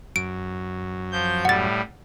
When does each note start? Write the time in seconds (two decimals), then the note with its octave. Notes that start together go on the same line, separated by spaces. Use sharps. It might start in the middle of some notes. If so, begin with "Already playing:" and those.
0.16 F#2 D7
1.11 F3 G6
1.45 A2 G3 F#5 A6